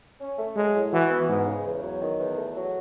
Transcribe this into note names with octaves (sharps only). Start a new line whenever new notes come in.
C#4
A3
F#3 G#3
A2
E3 F#4
B3
G#2 G#3
C#3
E2
F#3
D#3
E2
A3
F#3